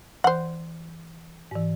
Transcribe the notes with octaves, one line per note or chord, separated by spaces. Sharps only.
E3 C5 F#5
G#2 E3